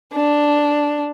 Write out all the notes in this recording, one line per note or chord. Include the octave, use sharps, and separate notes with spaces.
D4